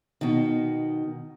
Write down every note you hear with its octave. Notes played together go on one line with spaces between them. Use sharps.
B2 D#3